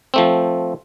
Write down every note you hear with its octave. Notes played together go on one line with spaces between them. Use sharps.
F3 A3 C4